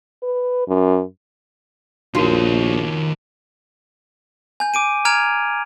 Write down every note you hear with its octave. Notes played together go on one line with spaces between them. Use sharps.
B4
F#2
A#1 D#3 D#4 F4 F#4 A#4 C#5
G#5 G6
D6 D7 D#7
A#5 F6 G#6 D7 F7